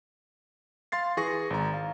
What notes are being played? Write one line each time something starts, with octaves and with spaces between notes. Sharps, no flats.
F5 C6 A6 C7
E3 G#4 C#6 A#6
G#1 A#5
F5